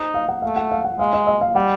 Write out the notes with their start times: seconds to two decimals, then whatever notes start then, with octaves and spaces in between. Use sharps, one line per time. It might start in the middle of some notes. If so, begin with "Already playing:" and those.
Already playing: D#4 C5
0.14 F5
0.29 F#5
0.42 A3 F5
0.56 F#5
0.71 F5
0.84 F#5
0.99 G#3 F5
1.13 D#5
1.27 D#5
1.41 F5
1.55 G3 F#5